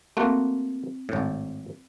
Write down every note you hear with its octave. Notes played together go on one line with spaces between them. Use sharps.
A3 A#3 C4 F#4
G#1 A2